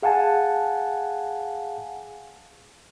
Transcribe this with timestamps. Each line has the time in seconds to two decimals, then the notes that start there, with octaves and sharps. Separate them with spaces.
0.03 G#4 F5 F#5 G#5 A5